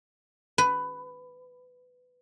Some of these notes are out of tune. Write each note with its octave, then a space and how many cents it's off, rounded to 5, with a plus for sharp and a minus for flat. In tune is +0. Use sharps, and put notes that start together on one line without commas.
B4 +15